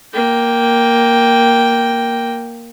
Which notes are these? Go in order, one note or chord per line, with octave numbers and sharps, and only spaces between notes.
A#3 G5